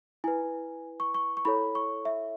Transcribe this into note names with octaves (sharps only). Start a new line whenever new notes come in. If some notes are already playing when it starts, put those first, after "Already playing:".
E4 B4 G#5
C#6
C#6
C#6
E4 A4 C#5 B5
C#6
E5